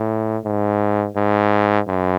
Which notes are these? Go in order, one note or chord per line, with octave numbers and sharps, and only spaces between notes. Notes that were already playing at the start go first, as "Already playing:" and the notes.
Already playing: A2
G#2
G#2
F#2